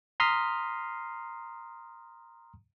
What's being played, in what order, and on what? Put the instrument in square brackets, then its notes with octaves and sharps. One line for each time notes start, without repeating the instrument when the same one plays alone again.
[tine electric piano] A#5 C6 D#6 F6 B6 C7